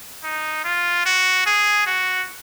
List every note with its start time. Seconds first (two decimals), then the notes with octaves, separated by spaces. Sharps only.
0.23 D#4
0.64 F4
1.05 F#4
1.46 G#4
1.87 F#4